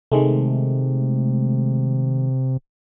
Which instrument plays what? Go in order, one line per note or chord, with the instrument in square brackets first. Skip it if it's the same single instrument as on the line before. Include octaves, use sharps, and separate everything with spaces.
[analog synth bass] C3 [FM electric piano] D#3 G#3 A3